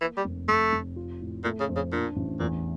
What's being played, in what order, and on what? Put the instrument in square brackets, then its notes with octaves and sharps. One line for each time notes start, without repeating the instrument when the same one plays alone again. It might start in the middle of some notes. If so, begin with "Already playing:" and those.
[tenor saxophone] E3 [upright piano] A#3
[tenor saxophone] G3
[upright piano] F1
[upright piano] F1 [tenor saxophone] A3
[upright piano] F1
F4
A2
[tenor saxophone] A#2 [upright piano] A3
[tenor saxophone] C#3
[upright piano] F2
[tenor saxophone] C#3
[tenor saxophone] A#2 [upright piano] D4
[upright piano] A1
[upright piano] E2 [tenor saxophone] A#2